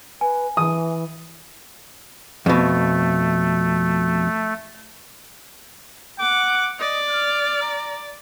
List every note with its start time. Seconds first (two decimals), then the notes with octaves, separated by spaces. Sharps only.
0.21 B4 G#5
0.57 E3 D#6
2.46 F2 B2 A3
6.19 F#5 D6
6.80 D5 D#5
7.10 F6
7.62 A#5